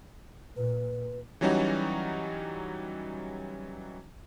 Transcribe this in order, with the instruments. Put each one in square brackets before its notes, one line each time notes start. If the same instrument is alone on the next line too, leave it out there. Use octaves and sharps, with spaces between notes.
[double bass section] A#2 [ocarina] B4
[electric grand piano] E3 F#3 G3 C#4 D#4 F#4